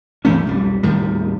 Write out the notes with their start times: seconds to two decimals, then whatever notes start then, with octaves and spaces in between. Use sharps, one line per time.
0.25 G2 E3 A3 C#4
0.45 B1 F2 G3
0.83 D#2 A2 D#3 G3